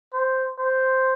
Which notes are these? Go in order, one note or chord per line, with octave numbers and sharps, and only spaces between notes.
C5
C5